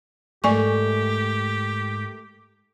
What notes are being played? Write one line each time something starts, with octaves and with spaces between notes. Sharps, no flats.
G#2 A3 G4 A#4 D5 G#5 C#6